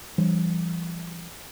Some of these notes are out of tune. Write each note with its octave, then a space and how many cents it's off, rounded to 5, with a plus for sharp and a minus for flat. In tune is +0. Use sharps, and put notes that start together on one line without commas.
E3 +45 G3 +0 D4 +0